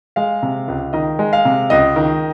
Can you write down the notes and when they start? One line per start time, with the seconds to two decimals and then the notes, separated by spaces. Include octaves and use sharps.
0.16 G#3 F5
0.43 C3
0.68 C#2
0.93 D#3 D#5
1.19 G#3
1.33 F5
1.45 C3
1.70 C#2 D#5
1.96 D#3